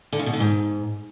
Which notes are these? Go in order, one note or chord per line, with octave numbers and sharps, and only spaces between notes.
D3
C#3
B2
D3
G#2